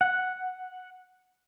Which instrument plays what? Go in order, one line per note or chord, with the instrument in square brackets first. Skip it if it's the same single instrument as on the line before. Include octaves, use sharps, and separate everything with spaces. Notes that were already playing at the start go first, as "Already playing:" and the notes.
[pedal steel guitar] F#5